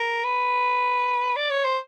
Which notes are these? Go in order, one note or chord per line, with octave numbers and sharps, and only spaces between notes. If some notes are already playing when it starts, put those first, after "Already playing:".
Already playing: A#4
B4
D5
C#5
C5